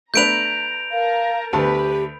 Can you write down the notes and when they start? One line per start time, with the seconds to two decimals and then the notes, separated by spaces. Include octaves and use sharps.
0.14 A3 D4 B4 A#5 G6 D7 F7
0.91 A#4 F5 A5 A#5
1.53 D2 G4 B4 A5 B5